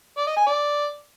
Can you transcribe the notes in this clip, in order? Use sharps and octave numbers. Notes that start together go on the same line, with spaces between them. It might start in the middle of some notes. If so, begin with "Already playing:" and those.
D5
D#5
G#5
D5